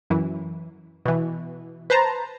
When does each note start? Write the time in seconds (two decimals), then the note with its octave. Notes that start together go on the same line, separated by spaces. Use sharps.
0.10 F#2 E3
1.06 B2 E3
1.90 B4 C5 A5 A#5